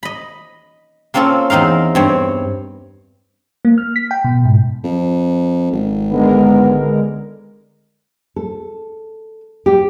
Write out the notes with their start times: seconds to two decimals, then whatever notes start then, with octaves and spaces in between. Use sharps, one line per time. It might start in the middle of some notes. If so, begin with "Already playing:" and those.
0.03 D#5 B5
1.14 A#3 C4 C#4 F4 A4
1.50 E2 C4 D#4 A#4 F5
1.95 G2 C4 C#5
3.65 A#3
3.78 F6
3.96 B6
4.11 G5
4.24 B2
4.45 G#2
4.84 F2
5.72 G#1
6.11 D3 G#3 B3 A#4
8.36 A4
9.66 G4